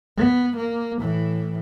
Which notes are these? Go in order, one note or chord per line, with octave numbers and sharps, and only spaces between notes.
B3
A#3
A2 E3